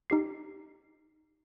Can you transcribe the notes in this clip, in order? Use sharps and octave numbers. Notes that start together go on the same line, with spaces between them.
D#4 G4 C7